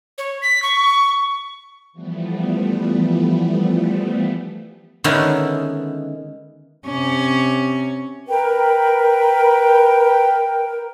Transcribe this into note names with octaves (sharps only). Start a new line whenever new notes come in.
C#5
B6
C#6
E3 F3 G3 A3 B3
D3 D#3 G#3 B3 C#4 E4
C3 C#4
A#4 B4 G5